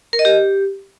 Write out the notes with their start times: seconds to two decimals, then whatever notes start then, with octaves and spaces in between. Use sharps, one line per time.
0.13 A#4
0.19 D#5
0.25 G4